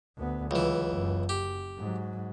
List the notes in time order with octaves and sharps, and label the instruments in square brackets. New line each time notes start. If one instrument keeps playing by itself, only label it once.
[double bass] D2 B3
[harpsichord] C#2 E3 [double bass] F#3
[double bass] F#1 F#2
[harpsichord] G4
[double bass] G#2 F#3